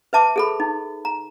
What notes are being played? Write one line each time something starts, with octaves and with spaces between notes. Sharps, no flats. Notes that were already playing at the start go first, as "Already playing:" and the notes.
B4 E5 A5 D6
G#4 A4 B5
D#4
A#5